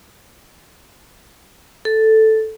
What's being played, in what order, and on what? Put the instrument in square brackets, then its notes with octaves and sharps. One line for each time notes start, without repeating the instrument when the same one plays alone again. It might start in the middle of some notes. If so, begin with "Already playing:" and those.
[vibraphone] A4